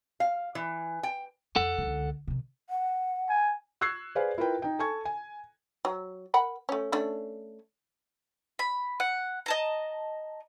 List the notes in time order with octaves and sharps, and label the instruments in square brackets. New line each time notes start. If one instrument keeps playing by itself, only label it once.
[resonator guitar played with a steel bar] F5
E3
G5
[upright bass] F2 [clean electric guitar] A4 F#5
[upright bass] C#2 D3
C3 D#3
[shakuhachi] F#5
[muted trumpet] G#5
[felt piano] C#6 E6 F#6 G#6 C7
G#4 B4 C5 D5 F5 G#5
E4 F4 A#4 B4 G5
D#4 G5
A4 G#5 A5 C#6 G#6
G#5
[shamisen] F#3
A#4 F#5 B5
A3 C#4
A3 C#4 D4
[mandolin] B5
F#5
D#5 A5 A#5